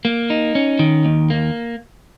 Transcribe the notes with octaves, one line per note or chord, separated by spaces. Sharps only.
A#3
D#4
C#4
D#3
D#2
A#3